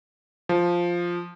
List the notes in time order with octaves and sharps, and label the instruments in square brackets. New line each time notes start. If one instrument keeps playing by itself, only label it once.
[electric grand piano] F3